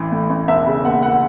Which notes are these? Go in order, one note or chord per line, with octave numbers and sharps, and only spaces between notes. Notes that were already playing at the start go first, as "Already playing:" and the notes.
Already playing: A1 E3
A2
A1
E1 E5
C#3
D#2 F#5
F#5